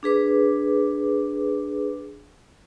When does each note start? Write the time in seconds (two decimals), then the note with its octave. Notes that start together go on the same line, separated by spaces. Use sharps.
0.03 D4 G#4 B4 D6